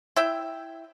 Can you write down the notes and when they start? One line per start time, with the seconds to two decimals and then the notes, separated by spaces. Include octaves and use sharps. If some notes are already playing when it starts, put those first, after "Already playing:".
0.16 E4 E5 G5